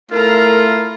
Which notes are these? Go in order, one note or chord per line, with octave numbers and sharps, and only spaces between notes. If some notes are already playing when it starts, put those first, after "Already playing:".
A3 E4 F4 A#4 A#5